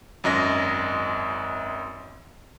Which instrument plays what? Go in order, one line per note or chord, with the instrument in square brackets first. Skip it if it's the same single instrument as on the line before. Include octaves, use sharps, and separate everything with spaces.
[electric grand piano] G#1 F#2 D#5 A#6